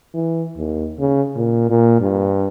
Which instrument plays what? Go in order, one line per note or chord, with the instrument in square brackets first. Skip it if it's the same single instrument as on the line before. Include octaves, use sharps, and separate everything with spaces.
[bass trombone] E3
D#2
C#3
A#2
A#2
G2